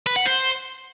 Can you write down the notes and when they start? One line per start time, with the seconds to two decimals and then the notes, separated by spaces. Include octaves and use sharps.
0.06 B4
0.16 F#5
0.26 C5